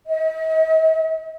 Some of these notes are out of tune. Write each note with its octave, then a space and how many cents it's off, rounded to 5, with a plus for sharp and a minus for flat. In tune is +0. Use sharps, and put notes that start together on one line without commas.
D#5 +45